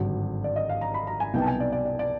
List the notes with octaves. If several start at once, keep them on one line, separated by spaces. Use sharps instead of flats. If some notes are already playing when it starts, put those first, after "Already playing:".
Already playing: G#1 G2 D3 F#3
D5
D#5
F5
A#5
B5
A#5
G#5
C2 B2 F#3 B3 D#4 G5
A5
G#5
D5
D5
D5
D5